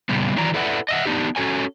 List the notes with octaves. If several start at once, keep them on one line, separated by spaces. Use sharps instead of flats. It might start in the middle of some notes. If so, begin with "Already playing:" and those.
A#2 C#3 G3 B3
D#3 E3 F#3 E4 D5 A#5
E4 A4 B4 D5 E5 F#5
D#5 E5 F#5
B3 D4 D#4 G4
C#4 F#4 A4 C#5 G#5